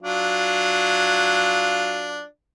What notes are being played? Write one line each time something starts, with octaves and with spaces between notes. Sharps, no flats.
F#3 D4 F4